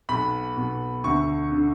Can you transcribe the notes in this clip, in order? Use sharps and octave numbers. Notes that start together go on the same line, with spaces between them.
B1 B2 B5
B1 B2
D2 D3 C#6
D3